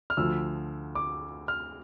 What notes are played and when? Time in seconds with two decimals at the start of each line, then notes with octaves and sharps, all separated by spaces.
0.10 F6
0.17 D2 D3 F3 E6
0.95 D6
1.48 F6